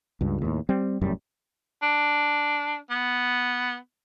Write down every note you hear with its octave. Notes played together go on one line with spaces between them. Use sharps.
C#2 G2
D#2 A2
G3 C4
F1 F#2 A2 G3
D4
B3